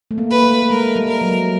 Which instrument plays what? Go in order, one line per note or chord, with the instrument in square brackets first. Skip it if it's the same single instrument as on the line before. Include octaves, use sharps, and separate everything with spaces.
[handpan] A3
A#3
[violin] B4
[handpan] A3
A3
[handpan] G#3 [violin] A#4
[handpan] G3
[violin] A#4
[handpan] F#3